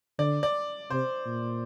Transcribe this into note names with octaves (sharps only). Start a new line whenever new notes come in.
D3 D5
D5
C3 C5
A#2